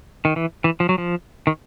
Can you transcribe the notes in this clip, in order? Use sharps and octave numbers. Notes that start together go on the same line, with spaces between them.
D#3
E3
E3
F3
F#3
F3
D#3